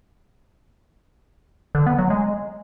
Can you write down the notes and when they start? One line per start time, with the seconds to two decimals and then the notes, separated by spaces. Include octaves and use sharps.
1.75 D3
1.86 B3
1.98 F#3
2.10 G#3